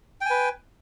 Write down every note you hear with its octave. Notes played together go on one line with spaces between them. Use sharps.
B4 G5 G#5